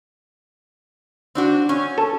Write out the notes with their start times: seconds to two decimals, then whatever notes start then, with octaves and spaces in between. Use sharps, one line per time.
1.35 C4 D4 F#4
1.69 C#4
1.98 A4